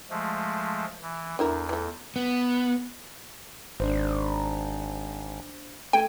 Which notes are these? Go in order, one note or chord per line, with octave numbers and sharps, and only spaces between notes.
F3 G#3 A3
E3
E2 D3 E4 A#4
E3 A3
B3
G#1 D4 C5
A3 G5 G#6 D#7